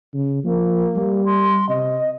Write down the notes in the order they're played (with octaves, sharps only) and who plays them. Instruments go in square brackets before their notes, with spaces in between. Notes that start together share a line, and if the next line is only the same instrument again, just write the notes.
[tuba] C#3
[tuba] F3 [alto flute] A#3
[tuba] G3
[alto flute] C6
[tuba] C3 [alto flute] D#5